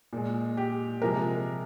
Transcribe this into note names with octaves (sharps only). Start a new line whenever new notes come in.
A#2 G#3
G4
C3 F3 G#3 A#4